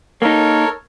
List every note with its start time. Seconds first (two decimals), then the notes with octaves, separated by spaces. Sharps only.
0.22 A#3 D#4 A4 A#4 C#5